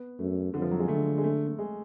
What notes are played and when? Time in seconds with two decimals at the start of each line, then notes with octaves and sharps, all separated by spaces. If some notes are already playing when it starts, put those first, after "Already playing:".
Already playing: B3
0.19 F#2 A3
0.53 F2 D3
0.62 F3
0.71 F#3
0.80 G#3
0.88 D3 A3
1.18 G#3
1.24 A3
1.47 A3
1.59 G#3